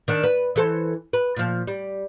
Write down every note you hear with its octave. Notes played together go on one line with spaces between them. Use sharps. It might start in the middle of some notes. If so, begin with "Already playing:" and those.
D#3 D4
B4
E3 A4 C5
B4
A#2 F3
G3